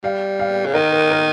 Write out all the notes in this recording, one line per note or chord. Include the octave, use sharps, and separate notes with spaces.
G3 F5
F5
C#3
D#3 A#4
A#4
A#4